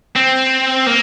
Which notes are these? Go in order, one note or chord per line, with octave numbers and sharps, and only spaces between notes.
C4
A#3